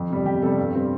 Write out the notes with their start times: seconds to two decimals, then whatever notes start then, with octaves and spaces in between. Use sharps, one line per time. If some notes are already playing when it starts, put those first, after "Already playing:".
Already playing: F2
0.10 C3 G3
0.26 F2 G4
0.42 C3 G3 A4
0.58 G2
0.74 G3 C4